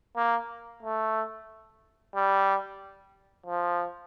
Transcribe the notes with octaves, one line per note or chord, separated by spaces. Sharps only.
A#3
A3
G3
F3